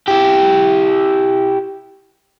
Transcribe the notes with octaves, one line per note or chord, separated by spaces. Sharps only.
E4 G4